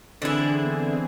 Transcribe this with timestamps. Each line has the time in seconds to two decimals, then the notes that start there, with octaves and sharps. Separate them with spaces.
0.22 D3 E3 C4 D4 E4 G#4
0.64 B3